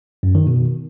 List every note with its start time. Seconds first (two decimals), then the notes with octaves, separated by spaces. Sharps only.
0.23 F#2
0.35 D#3
0.47 B2